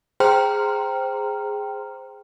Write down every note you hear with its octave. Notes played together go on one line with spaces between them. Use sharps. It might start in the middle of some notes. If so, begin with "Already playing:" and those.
G#4 C5 G5 A#5 C6 F6